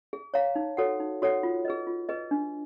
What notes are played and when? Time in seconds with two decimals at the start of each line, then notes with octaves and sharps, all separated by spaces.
0.13 G#4
0.34 C#5 F5 A#5
0.56 D#4
0.77 F#4 A4 C#5 F#5
1.00 D#4
1.22 F#4 A4 C#5 F#5
1.43 F4
1.65 G#4 B4 D#5
1.87 F4
2.09 G#4 B4 D#5
2.31 D4